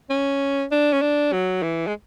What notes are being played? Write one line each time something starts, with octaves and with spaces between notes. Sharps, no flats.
C#4
D4
C#4
D4
F#3
E3
G#3